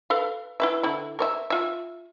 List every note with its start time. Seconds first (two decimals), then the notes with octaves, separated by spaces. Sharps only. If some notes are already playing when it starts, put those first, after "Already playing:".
0.10 A4 B4 F5
0.60 E4 B4 E5
0.83 D3 E4
1.19 A#4 C#5 E5
1.50 F4 E5